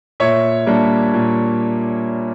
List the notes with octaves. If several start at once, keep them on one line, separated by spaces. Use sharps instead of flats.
A#2 C#5 E5
G3 A#3 D4
A#2